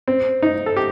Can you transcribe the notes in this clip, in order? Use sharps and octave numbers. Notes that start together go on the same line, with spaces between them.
C4
D#4
A4
G4